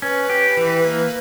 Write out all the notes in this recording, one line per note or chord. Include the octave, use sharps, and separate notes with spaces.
C#4 B4
G4
E3
A#3